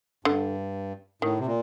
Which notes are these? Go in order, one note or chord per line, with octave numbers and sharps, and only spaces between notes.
G2 D3
A2 D#3
C3
A#2